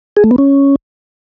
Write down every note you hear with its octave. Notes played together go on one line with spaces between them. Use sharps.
G#4
A3
B3
C#4